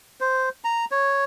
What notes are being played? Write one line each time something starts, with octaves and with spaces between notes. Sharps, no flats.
C5
A#5
C#5